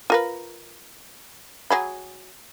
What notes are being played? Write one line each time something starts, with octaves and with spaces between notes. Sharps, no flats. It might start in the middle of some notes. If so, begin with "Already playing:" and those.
F4 A#4 B4
F#3 G#4 B5